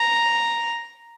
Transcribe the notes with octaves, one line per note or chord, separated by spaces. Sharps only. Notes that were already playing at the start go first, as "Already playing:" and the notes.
Already playing: A#5